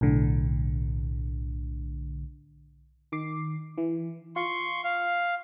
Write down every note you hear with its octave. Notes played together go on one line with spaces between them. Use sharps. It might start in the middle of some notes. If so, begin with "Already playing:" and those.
B1 A2 D3
D#3 D6 C7
E3
F4 C6 C#6
F5